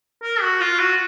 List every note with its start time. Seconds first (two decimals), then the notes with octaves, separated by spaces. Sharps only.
0.23 A#4
0.42 F#4
0.61 F4
0.79 F#4